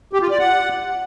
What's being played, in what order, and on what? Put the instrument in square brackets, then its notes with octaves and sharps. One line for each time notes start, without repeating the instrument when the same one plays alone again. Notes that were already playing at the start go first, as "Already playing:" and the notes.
[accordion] G4
F4
D5
F#5